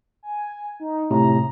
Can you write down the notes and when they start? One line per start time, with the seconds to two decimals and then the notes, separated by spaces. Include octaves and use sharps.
0.23 G#5
0.80 D#4
1.11 A2 C3 A#5